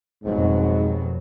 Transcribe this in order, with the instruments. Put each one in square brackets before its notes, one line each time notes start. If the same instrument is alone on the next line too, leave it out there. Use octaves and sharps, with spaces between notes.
[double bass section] F1 B2 F#3 [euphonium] G#2